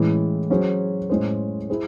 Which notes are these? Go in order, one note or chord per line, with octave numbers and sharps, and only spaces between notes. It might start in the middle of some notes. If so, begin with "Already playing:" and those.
Already playing: A2 E3 G#3 C#4
F#3 C#4 G#4 C5
A2 G#3 C#4 G#4 C5
E4 G#4 C5